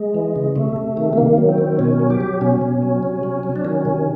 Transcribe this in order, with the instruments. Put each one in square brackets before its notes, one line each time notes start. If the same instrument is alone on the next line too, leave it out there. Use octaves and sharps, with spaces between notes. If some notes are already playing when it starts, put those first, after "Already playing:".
Already playing: [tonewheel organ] G#3
E3
C#3
C3 A3
C3
D#3
A3
D#3 A#3
F#3
C4
D#3
B2 C#4
F#3
G4
F#3
B2 C#4
B2
F#3
C3
F#3
F#3
D4
D#3 C#4
C3